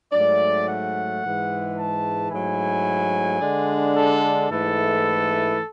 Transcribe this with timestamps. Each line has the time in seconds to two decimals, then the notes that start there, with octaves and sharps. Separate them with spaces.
0.12 G#2 F#3 A3 D5
0.67 F#5
1.22 G#2 E3 G#3
1.76 A5
2.31 G#2 F#3 A3 E4 G#5
3.40 D3 G#3 D4
3.95 A4
4.49 G#2 E3 A3 E4 A4